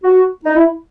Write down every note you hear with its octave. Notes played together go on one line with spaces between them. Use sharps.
F#4
D#4
E4